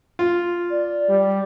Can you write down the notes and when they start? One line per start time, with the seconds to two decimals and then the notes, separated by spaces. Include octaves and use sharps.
0.19 F4
0.71 D5
1.09 G3